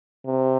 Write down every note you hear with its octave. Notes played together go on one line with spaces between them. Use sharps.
C3